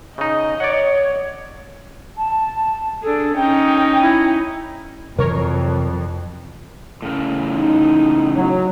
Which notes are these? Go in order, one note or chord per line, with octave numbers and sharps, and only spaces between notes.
C#3 D#4 D#5
C#5 D5 F#5
A5
D4 G#4 A4
C#4 D#4 D#5 G5
E4
F2 C3 E3 F#3 A#4 C#5
A2 C#3 A#4
D#4
F#3